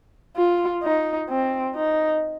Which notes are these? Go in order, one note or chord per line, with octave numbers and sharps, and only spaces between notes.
F4
D#4
C4
D#4